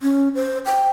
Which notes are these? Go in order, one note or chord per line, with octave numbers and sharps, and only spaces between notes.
C#4
C5
G5